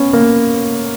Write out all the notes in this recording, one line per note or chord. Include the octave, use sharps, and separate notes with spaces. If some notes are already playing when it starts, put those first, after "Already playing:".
Already playing: B3 C#4
A#3